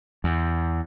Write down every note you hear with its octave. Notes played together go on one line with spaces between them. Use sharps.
E2